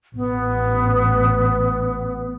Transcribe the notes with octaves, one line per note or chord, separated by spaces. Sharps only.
A1 B3